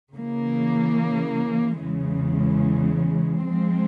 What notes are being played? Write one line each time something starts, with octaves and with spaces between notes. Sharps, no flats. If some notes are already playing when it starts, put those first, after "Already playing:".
C#3 E3 A#3
E2 C#3 E3 G#3
F3 G#3 C4